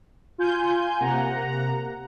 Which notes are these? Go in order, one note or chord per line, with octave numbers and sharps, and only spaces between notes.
F4 G#5 G6
C3 A#3 F#5 A#5